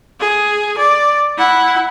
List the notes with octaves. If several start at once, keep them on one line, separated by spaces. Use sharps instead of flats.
G#4
D5
E4 F#5